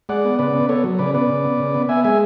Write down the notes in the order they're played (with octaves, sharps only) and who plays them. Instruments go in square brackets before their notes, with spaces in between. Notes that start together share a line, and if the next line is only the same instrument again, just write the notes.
[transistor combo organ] G#3 D5 F#5
B3
C#3 B4 D5
B3
B3 A4 C#5
F#3
C#3 B4 D5
B3 B4 D5
C#3
B3
C#3
B3
B3 E5 G#5
G#3 E5 G#5